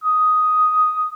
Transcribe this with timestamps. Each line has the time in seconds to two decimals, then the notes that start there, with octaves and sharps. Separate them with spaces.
0.04 D#6